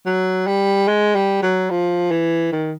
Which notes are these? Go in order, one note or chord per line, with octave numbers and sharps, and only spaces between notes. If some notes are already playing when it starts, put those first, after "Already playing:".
F#3
G3
G#3
G3
F#3
F3
E3
D#3